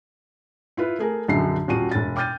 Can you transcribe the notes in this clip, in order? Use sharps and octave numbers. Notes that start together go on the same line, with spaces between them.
E4 F4 B4
A3 G#4 A#4
A#1 F#2 D3 D#4 E5 C7
D#1 F4 F#4 A5 D#7
E1 A6
G5 D6 F6 G6 A6 D#7